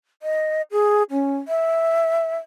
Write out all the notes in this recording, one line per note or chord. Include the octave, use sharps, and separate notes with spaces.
D#5
G#4
C#4
E5